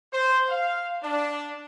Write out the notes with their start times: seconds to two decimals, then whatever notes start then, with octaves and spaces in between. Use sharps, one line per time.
0.13 C5
0.49 F5
1.03 D4